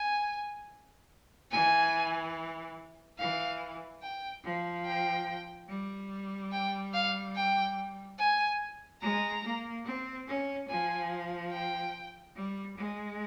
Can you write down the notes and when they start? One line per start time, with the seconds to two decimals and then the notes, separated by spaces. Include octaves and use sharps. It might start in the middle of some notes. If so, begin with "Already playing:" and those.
Already playing: G#5
1.52 E3 G#5
3.19 E3 F5
4.02 G5
4.44 F3
4.85 G5
5.69 G3
6.52 G5
6.94 F5
7.35 G5
8.19 G#5
9.02 G#3 A#5
9.43 A#3
9.85 C4
10.27 C#4
10.69 F3 G#5
11.52 G5
12.36 G3
12.77 G#3